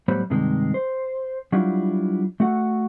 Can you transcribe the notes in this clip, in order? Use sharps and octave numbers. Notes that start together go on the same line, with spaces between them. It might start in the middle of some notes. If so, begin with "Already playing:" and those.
A2 F#3 G3 B3 C5 B5
G2 C3 D#3 G#3
C5
F#3 G3 D4 E4 F4
A3 F#4 F#5